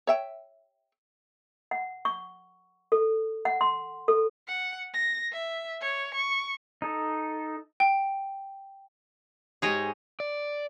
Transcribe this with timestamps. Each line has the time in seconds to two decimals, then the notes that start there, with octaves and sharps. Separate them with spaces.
0.07 C#5 E5 G5
1.71 F#5
2.05 C#6
2.92 A4
3.45 F#5
3.61 C6
4.08 A4
4.47 F#5
4.94 A#6
5.32 E5
5.81 C#5
6.14 C#6
6.82 D#4 A4
7.80 G5
9.62 G#2 G4 G#4 C#5 D#5
10.20 D5